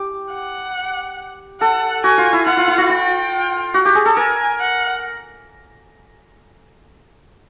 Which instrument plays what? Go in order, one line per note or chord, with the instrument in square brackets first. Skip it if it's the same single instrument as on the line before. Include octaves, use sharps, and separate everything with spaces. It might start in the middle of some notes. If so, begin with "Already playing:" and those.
Already playing: [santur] G4
[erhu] F#5
[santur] A4 [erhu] F#5
[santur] F#4 [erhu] G#5
[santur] F4
E4
[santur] E4 [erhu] F#5
[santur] F4
E4
F4
[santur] F4 [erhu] G5
[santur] F#4
G4
G#4
A4
[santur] A#4 [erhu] G#5
[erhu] F#5